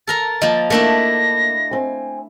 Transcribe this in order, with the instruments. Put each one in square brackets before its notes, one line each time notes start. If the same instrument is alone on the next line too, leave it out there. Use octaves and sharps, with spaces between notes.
[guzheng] A4 A#4 A#5 [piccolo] A6
[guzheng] F3 A#3 [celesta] D#5
[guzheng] A3 D4 E4 [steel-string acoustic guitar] A#3 [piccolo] A#6
[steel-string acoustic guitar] C4 G#5